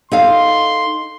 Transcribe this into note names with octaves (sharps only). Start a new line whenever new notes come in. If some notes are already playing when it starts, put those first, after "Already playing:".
D#4 A4 F5 C6